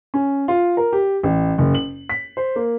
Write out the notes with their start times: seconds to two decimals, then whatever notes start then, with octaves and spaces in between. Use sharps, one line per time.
0.14 C#4
0.48 F4
0.77 A#4
0.93 G4
1.23 A1
1.58 F#1
1.75 F#7
2.09 B6
2.37 C5
2.56 A#3